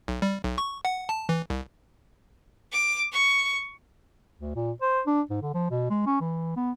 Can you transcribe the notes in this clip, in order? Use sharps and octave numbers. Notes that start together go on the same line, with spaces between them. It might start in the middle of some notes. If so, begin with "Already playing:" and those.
B1
G3
B1
C#6
F#5
A5
E3
C2
D6
C#6
D2
A#2
C5
D4
G#2
D3
F3
B2
G#3
C#4
E3
B3